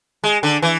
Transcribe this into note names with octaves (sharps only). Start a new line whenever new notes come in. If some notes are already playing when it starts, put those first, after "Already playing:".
G#3
D3
E3